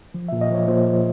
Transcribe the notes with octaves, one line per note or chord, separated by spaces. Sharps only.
F3
A#2 E5
D#5
F3 C#5
A#2 C5
F3